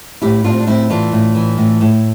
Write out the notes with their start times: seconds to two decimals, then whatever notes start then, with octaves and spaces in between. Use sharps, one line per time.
0.22 A2 E4 G4
0.44 A2 D4 F4
0.52 C4
0.59 D4
0.67 A2 C4 E4
0.90 E3 D4 F4
1.12 A2
1.35 E3
1.58 A2
1.81 A2